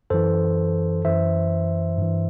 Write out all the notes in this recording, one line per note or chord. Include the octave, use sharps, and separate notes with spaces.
F#2 E3 A4 C5
F#2 E3 C5 E5
G2 E3